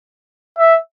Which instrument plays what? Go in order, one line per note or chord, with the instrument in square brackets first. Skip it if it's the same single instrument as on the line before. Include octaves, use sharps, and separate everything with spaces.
[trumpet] E5